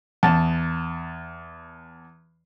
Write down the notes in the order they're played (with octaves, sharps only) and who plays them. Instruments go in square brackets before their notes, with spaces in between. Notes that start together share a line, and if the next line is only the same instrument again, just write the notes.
[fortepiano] E2 A5